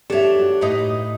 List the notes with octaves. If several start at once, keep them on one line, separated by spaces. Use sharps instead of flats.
D4 G4 A4 C#5 E5
F#4
A2 D#4 B4 D#5